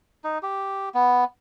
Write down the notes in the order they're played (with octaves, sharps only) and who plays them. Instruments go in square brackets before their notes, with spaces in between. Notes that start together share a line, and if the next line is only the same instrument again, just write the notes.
[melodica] D#4
G4
B3